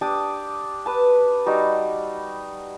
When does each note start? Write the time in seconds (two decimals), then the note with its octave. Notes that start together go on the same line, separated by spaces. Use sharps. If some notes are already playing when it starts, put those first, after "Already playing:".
0.01 D4 G4 D6 D#6
0.86 B4 A5
1.46 G3 D#4 F#4